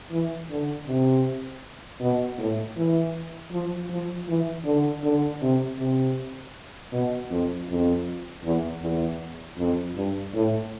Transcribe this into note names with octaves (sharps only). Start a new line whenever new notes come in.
E3
D3
C3
B2
A2
E3
F3
F3
E3
D3
D3
C3
C3
B2
F2
F2
E2
E2
F2
G2
A2